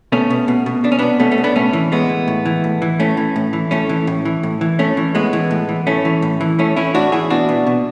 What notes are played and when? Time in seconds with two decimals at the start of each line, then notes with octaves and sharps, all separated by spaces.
0.12 B2 A3 C#4
0.30 B2
0.48 B2
0.66 B2
0.84 B2 D4
0.92 C#4
0.99 B2 B3 D4
1.20 B2 A3 C#4
1.31 A3 C#4
1.38 B2
1.44 B3 D4
1.56 A2 A3 C#4
1.73 E3
1.92 A2 G#3 B3
2.09 E3
2.28 A2
2.46 E3
2.64 A2
2.82 E3
3.00 A2 A3 C#4
3.17 E3
3.36 A2
3.53 E3
3.71 A2 A3 C#4
3.89 E3
4.07 A2
4.25 E3
4.43 A2
4.61 E3
4.79 A2 A3 C#4
4.97 E3
5.15 A2 G#3 B3
5.33 E3
5.51 A2
5.69 E3
5.87 A2 A3 C#4
6.05 E3
6.22 A2
6.41 E3
6.59 A2 A3 C#4
6.76 E3 C#4 E4
6.94 A2 D4 F#4
7.12 E3 E4 G#4
7.30 B2 D4 F#4
7.49 B2
7.67 B2